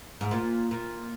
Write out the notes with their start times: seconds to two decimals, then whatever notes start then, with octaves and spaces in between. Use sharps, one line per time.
0.21 G#2
0.31 A#2
0.71 A#2